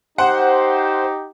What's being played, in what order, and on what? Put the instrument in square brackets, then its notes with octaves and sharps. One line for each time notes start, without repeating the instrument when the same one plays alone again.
[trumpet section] D#4 G4 [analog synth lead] C5 [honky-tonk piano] F#5